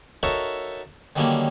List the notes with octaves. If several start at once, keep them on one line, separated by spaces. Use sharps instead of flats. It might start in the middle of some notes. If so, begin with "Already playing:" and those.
D#4 F#4 A4 A#4 C#5 E5
D3 D#3 F#3 G3 A#3 C#4